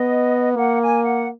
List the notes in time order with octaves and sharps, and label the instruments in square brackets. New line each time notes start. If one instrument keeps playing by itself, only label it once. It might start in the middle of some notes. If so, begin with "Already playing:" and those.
Already playing: [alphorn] B3 [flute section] D#5
[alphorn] A#3 [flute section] F#5
[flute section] G#5
F#5